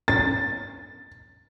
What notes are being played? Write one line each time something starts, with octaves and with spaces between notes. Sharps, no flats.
A6